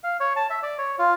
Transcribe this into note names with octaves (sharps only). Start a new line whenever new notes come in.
F5
C#5
A5
E5
D5
C#5
F4